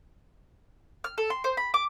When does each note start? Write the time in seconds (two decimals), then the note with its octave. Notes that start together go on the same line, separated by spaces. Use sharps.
1.04 F6
1.18 A4
1.30 C6
1.44 C5
1.57 B5
1.74 D6